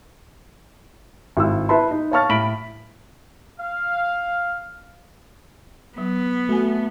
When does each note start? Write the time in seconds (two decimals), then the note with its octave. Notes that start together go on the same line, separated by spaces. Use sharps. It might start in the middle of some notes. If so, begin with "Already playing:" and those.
1.37 G#1 E4 E6
1.69 E4 B4 E5 A5 B5 C6
1.91 D#4
2.11 C#5 F5 A5 C#6 F6 A6
2.29 A2 B5 B6 D7 F#7
3.60 F5
5.98 F#3 B3
6.49 A3 F#4 G#5